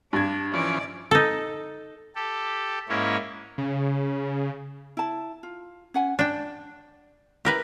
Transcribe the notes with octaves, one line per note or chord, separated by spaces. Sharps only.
G2 D4 G#6
E3 F3 C#4 D5
D#4 A4
G4 A4
G#2 A#3 C#4 E4 C#5
C#3
E4 A5
F4
C#4 F#5 G#5
D4 D5 G5
E4 G4 A#4 B4